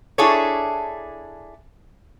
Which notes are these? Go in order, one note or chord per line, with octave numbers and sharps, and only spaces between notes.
D4 E4 G#4 A4 C#5